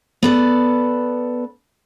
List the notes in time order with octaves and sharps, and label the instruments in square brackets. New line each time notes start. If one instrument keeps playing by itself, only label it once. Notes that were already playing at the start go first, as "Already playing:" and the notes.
[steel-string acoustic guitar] B3 A4 D5